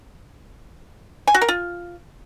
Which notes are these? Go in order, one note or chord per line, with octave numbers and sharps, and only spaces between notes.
G#5
F#4
A#4
F4